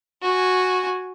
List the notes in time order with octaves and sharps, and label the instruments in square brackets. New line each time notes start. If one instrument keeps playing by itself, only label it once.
[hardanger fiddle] F#4 G#5